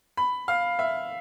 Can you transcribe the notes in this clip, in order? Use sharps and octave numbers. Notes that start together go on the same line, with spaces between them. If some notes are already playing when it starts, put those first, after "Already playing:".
B5
F5
E5